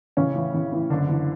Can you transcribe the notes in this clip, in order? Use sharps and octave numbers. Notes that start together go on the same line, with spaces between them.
A1 C#3 C#4
A2 E3
A1
A2 E3
F#1 D3 D4
E3